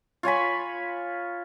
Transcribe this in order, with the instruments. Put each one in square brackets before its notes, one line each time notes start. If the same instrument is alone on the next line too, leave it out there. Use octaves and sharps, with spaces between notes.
[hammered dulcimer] F4 C#5 G#5 B5